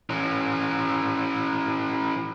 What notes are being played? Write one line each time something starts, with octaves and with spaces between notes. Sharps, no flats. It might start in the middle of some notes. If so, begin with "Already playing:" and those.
E3 C#4